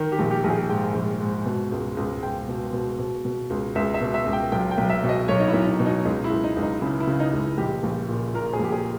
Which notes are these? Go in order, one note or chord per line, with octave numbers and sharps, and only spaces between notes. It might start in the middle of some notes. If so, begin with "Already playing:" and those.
Already playing: D#3
G4
A#1
G4
A#1
G#4
G#2 G5
A#1
G#2
B2
C#2
C#2
C#2 G5
B2
B2
B2
B2
C#2
C#2 E5
E5
B2
E5
C#2
G5
B1 G5
G5
B1
E5
B2
D#5
B1 C#5
D#4
E4
B1
D#4
B2
D#4
C#2 D#4
E4
C#2
D#4
C#2
D#4
C#3 E4
E4
C#3
D#4
C#2
E4
A#1 G4
A#1
A#2
A#2 A#4
G#4
A#1 G4
G#4